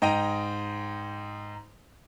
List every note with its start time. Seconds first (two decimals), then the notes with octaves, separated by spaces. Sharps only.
0.02 G#2 D#5 G5 A#5 D#7